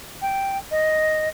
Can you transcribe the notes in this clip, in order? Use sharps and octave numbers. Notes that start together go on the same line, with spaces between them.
G5
D#5